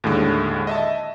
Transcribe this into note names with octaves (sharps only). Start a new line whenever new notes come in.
D#2 A2 D3 G#3
D#5 E5 A5